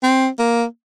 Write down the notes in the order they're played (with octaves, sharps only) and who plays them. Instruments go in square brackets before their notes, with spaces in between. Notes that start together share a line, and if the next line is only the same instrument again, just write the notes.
[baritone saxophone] C4
A#3